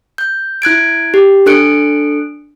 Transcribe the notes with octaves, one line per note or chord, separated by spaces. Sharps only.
G6
E4 F#6 G#6 D7
G4
D4 A4 F#6 C#7 D7